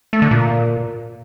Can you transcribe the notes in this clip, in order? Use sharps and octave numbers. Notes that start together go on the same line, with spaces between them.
A3
D3
A#2